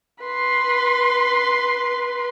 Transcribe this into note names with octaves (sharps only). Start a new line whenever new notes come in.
B4 C6